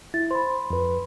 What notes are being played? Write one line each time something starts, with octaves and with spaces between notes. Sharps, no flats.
E4 A6
C5 B5 C6
F2 B4